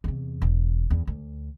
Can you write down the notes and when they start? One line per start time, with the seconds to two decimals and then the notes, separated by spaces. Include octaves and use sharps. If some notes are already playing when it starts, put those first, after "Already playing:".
0.04 E2 C3
0.42 E1
0.90 E2
1.07 D2